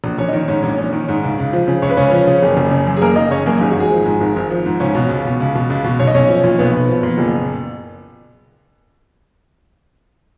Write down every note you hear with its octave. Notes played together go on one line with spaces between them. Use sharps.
A#1
A#1 C#4 C#5
D#5
D#3 C#4 C#5
G#2 C#4 C#5
A#1 C#4 C#5
A#1
D#3
G#2
C#2
C#2
F3
C#3
C#2 C#5
B4
C#2 C#4 C#5
F3
C#3
F#1
F#1
C#3
F#2
G#4
F#1 A#3 A#4
F#1 D#4 D#5
C#3 C#4 C#5
F#2 A#3 A#4
G#1 G#4
F#4
G#1 G#3 G#4
F3
G#2
G#1
G#1
F3
G#2
C#2 C#4 C#5
B2
C#2
B2
C#2
B2
C#2
B2
B1 C#5
D#5
B1 C#4 C#5
F3
A#2
B1 B3 B4
B1
F3
A#2
F#1